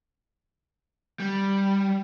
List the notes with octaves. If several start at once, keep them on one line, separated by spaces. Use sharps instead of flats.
G3